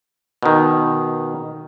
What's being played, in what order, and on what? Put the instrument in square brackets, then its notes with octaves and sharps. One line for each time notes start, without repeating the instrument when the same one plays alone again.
[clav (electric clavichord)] B2 D#3